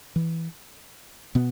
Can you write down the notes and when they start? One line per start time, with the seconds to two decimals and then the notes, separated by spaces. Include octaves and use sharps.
0.16 E3
1.35 B2 B3